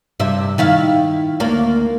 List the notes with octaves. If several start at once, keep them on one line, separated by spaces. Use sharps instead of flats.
G2 C3 E5
D#3 E4 F5
D2 A#3 D5